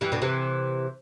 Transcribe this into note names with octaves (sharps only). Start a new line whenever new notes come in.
E3 G3
B2 D3
C3 E3